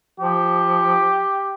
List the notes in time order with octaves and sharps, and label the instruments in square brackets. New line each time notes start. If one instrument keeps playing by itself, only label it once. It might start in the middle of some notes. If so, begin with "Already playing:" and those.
[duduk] F3 [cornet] G4